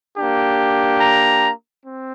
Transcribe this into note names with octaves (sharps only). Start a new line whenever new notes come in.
A#3 D4 G4
A#5
C4